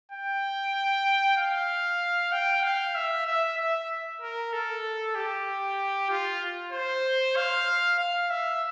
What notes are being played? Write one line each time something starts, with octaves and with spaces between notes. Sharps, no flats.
G5
F5
G5
F5
E5
E5
E5
A#4
A4
G4
F4
C5
F5
F5
E5